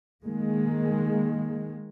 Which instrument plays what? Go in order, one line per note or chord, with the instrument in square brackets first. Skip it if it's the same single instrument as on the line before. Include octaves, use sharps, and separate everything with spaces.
[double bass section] D#3 G#3 A#3